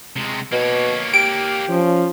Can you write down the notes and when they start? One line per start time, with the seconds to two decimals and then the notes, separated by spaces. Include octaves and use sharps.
0.16 C3 G#3
0.52 B2 A#3 C#5
1.14 G4 D7
1.68 F3 C#4